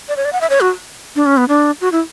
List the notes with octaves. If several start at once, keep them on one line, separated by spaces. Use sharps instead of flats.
D5
C#5
D5
F#5
E5
C#5
F#4
D4
C#4
B3
D4
F#4
E4